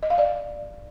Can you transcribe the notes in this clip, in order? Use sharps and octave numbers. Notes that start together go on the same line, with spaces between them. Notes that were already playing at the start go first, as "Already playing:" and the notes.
D#5
F5
D5